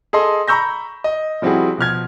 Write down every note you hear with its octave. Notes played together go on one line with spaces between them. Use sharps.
G#4 A4 D#5 C6
A#5 B5 C#6 E6 G6 A#6
D#5
F3 G3 C4 E4 F#4 G#4
B2 F3 F6 G#6